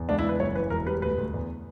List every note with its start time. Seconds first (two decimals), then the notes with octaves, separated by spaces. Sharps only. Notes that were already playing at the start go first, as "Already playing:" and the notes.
Already playing: E2
0.09 C#2 D4
0.19 E4
0.24 C#2 B4
0.40 F#1 C#5
0.55 E3 B4
0.70 E1 A#4
0.86 G3 B4
1.02 D2 B4
1.18 D2
1.34 E2